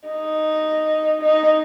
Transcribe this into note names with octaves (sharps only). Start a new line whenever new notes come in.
D#4
D#4